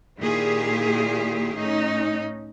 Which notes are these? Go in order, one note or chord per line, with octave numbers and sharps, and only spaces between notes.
A#2 D#3 E4 G4 G#4 F5
A2 C#4 D#4